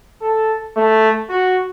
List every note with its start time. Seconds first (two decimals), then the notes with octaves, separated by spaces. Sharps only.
0.21 A4
0.76 A3
1.29 F#4